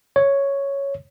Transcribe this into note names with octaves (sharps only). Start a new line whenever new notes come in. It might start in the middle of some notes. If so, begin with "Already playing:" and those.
C#5